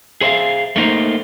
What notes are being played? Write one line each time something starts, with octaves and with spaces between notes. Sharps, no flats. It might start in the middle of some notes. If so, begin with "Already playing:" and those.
G#4 C5 E5 F5
A3 A#3 D#4 C5